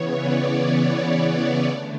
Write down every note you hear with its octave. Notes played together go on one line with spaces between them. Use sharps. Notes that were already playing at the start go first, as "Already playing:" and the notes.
Already playing: C#3 E3 B3 C#5
D5
D5
C#5
D3 A3